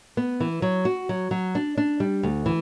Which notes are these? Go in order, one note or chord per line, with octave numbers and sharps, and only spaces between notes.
B3
E3
F#3
F#4
F#3
F#3
D4
D4
G3
D2
E3